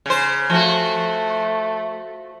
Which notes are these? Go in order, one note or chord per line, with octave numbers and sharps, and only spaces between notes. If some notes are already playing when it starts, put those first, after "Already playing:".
C#3 C5
F3 A3 F#4